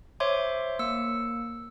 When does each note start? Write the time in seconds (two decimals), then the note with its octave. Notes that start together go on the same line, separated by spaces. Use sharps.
0.20 C5 C#5 E5 C6 D6
0.79 A#3 E6 C#7